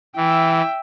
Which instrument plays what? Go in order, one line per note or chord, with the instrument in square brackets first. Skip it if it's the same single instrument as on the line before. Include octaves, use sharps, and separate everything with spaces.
[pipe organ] E3 [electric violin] E5 G5